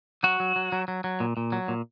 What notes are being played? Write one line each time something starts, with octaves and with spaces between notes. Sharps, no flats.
F#3 F#4
F#3
F#3
F#3
F#3
F#3
A#2
A#2
F#3
A#2